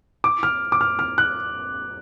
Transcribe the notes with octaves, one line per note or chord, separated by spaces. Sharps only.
D6
F6
D6
F6
F6
F#6